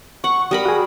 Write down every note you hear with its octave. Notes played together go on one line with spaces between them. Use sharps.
F#5 C#6
G3 A#4 B5 D#6
F#4 G#4